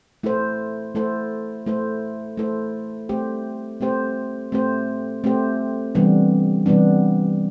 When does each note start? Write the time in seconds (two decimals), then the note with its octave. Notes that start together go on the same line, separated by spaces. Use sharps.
0.23 A3 E4 A4 C5
0.95 A3 E4 A4 C5
1.66 A3 E4 A4 C5
2.37 A3 E4 A4 C5
3.09 A3 C4 G4 C5
3.81 A3 C4 G4 C5
4.52 A3 C4 G4 C5
5.24 A3 C4 G4 C5
5.95 C3 E3 G3 B3 D4
6.66 C3 E3 G3 B3 D4